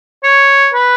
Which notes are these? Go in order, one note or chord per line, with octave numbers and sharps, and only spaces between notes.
C#5
B4